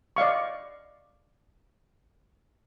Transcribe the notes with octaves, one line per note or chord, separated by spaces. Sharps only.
D5 D#5 F5 C#6